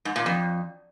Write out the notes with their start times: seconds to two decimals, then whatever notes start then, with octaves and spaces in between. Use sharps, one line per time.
0.05 G#2
0.16 A#2
0.26 F2